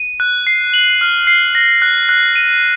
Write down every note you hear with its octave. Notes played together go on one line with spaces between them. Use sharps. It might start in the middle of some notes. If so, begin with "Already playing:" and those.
Already playing: D#7
F#6
C7
F#7
F6
C7
A#6
F#6
F#6
D#7